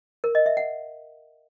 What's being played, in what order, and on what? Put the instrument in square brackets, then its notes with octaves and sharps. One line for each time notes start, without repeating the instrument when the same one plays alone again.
[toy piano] A#4
D#5
E5
F#5